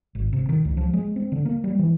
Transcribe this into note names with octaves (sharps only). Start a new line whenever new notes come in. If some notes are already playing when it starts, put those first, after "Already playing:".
G#1
C3
D#3
C#2
F3
G#3
C4
D3
A#3
G3
E3